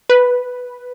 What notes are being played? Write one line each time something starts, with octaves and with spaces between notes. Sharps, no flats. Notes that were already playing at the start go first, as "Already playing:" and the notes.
B4